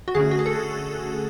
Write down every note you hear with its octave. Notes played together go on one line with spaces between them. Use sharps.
F#4
D3 A3 C#4 G#4
F#4
G#4
A4